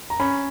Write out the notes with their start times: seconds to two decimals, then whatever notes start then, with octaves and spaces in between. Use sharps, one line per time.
0.10 A#5
0.20 C#4 B5